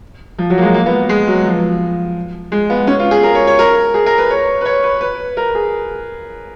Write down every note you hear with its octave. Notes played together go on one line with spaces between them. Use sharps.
F3
F#3
A#3
G#3
A#3
B3
G#3
F#3
F3
G#3
B3
C#4
F4
G#4
A#4
C#5
C#5
A#4
G#4
A#4
B4
C#5
B4
C#5
B4
B4
A#4
G#4